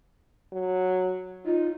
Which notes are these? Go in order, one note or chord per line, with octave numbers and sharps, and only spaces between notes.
F#3
D#4 F4